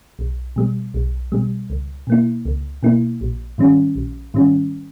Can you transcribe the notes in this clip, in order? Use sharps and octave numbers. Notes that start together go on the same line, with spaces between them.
B1
B2 G3
B1
B2 G3
C#2
B2 A#3 E4
C#2
B2 A#3 E4
A#1
G#2 D#3 G3 C#4
A#1
G#2 D#3 G3 C#4